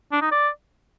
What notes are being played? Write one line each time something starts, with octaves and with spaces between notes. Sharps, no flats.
D4
D#4
D5